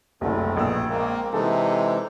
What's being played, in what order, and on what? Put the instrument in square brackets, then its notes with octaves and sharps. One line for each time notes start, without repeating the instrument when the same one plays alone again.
[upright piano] F#1 C2 [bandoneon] D3 C4 [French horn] A3
[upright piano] A#1 E6 [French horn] B2 [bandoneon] G#4
[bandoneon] G#3 C4 [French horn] A#3
[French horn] C3 [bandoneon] E3 G#3 D#4 [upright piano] A4